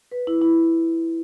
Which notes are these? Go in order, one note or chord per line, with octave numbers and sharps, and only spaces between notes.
B4
E4
E4